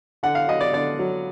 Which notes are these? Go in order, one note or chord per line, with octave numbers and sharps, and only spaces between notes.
D3 F#5
F5
F#3 D#5
D5
D3 D5
F#3